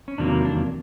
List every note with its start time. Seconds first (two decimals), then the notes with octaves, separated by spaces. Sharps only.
0.08 C#4
0.18 E2 C3 D#3 F#3 A#3 D4
0.45 D4